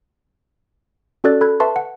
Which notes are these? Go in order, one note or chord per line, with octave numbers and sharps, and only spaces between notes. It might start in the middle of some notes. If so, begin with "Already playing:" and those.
C#4 F#4 A4 D5 F#6 A6
A4 B5 F#6 G#6
B4 E5 A5 C6 C#6
F#5